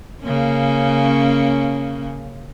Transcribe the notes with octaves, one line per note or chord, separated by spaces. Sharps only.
C#3 A#3 C#4